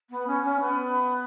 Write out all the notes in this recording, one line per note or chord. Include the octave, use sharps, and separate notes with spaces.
B3
C#4
C#4
B3